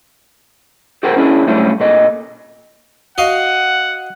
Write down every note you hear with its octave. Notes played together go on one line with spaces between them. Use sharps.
G4 A4 A#4 C5 F#5 G5
C#4 D4 E4 G#4
F#2 A2 G3 A3 C#4 D4
A#2 A4 D#5
F#4 D#5 F5 F#5